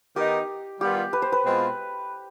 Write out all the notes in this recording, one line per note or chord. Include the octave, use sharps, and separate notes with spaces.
D#3 B3 D#4 G4
D#3 G3 B3 F4 G4
B4
C5
B4
B2 G#3 C4 F4